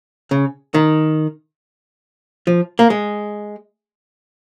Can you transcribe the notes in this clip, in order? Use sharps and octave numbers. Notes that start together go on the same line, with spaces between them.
C#3
D#3
F3
A#3
G#3